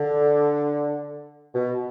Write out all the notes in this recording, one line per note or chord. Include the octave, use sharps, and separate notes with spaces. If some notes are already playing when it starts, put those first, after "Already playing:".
Already playing: D3
B2